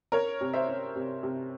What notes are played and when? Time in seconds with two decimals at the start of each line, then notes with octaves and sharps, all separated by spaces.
0.12 C#4 A#4 C#5
0.41 C3
0.53 C5 E5
0.68 C#4
0.96 C3
1.23 C3